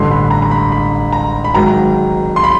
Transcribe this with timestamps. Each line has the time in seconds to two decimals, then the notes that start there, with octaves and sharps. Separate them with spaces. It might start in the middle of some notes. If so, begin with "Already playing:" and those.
Already playing: A1 G2 D3 C6
0.11 B5
0.31 A#5
0.42 A#5
0.51 B5
0.72 B5
1.13 A#5
1.44 B5
1.54 G#1 G#2 D#3 F#3 A#5
2.36 C6
2.44 B5